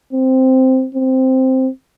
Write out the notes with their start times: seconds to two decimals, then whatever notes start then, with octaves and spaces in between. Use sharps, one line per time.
0.13 C4
0.95 C4